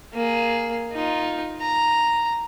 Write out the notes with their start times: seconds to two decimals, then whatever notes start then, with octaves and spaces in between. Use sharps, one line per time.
0.13 A#3 G#4
0.92 D#4 F4
1.62 A#5